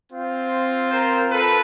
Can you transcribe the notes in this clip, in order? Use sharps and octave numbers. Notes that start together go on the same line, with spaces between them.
C4 F4
A#4 C5
A4 B4